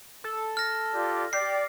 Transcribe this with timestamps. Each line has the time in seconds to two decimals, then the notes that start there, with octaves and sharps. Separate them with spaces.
0.24 A4
0.57 F6 A#6
0.94 F4 G4 D5
1.33 G4 D5 C7